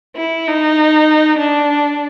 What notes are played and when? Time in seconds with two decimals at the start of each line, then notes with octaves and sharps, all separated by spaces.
0.16 E4
0.47 D#4
1.38 D4